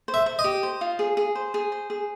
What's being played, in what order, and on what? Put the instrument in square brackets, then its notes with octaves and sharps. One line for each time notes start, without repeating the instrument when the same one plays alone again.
[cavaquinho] C5
[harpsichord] E5
[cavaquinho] C5
[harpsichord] D#5
[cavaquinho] G4
C5
F4
G#4
G#4
C5
G#4
C5
G#4